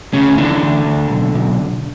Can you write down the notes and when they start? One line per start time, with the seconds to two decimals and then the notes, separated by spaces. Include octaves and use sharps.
0.13 D2 C#3 C#4
0.38 D3 E3 D4
0.62 D2
0.85 D2
1.10 B1
1.34 B1